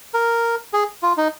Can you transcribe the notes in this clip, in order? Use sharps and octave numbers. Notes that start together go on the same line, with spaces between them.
A#4
G#4
F4
D#4